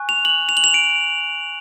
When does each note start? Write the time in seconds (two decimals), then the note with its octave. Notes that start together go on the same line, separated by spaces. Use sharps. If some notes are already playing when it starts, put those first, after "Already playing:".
Already playing: G#5 C#6 F#6
0.09 F7
0.25 F#7
0.49 F7
0.57 F#7
0.64 F7
0.74 D7